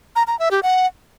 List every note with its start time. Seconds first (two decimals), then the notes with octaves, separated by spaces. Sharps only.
0.16 A#5
0.27 A#5
0.39 E5
0.51 G4
0.63 F#5